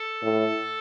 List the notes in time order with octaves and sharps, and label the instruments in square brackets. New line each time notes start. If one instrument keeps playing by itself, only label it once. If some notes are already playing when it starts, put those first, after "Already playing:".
Already playing: [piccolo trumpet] A4
[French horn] A2